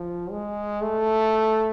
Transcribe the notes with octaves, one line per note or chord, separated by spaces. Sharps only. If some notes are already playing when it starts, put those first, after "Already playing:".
Already playing: F3
G#3
A3